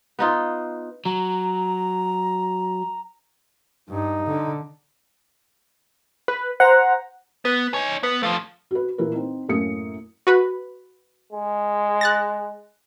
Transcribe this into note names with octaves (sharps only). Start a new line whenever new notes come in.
B3 D#4 F4
F#3 A#5
G2 D#4
D3
B4
C5 F#5 A#5
B3 B4
D#4 C#5 G#5
B3 B4
F3 A3 F5
F#4 B4
A#2 E3 E4 A#4 B4
C4 D#4
F#2 A2 A#3 C#4 D#6 C#7
F#4 B4 B5
G#3
F#6 A6 A#6